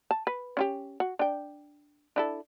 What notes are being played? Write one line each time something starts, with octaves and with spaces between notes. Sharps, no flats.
A5
B4
C#4 F4 G4
F#4
D4 G5
D4 E4 A4